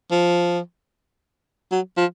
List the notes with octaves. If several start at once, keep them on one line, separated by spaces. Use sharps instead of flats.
F3
F#3
F3